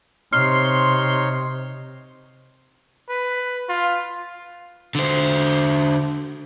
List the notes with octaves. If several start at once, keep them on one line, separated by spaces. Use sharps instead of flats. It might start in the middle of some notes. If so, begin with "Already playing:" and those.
C3 D#4 C#5 C6 F6
B4
F4
D3 C5